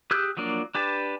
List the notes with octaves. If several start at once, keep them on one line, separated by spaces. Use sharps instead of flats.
G4 G#4 E6 F#6 G6
F3 F#3 A#3 D4
D4 G4 B4 A5